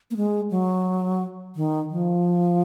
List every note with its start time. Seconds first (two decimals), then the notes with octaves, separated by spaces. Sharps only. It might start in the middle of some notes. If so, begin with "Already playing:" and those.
0.11 A#3
0.17 G#3
0.51 F#3
1.56 D#3
1.90 F3